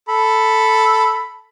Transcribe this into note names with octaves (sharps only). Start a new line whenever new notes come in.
A4 B5